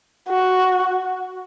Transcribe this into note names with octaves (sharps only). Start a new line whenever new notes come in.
F#4